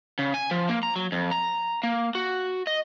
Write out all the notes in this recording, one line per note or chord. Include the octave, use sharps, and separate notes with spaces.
C#3
G#5
F3
A#3
A#5
F#3
F2
A#5
A#3
F#4
D#5